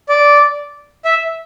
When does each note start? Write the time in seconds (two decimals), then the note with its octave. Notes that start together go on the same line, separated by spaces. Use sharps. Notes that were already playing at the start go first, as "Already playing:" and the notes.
0.09 D5
1.05 E5